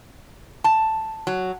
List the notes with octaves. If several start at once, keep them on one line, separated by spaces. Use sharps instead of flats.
A5
F#3